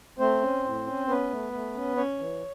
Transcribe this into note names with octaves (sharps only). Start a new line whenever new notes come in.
A3 C4 C5
C#4
A2
C#4
B3 C#4 B4
A3
A3
C#4
C#4 C#5
E3